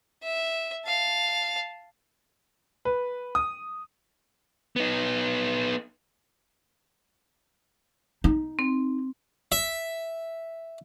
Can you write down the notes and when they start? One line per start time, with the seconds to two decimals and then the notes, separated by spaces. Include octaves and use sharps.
0.23 E5
0.86 F5 A5
2.85 B4
3.35 D#6
4.76 B3 D#4
8.24 D#4
8.59 C4
9.52 E5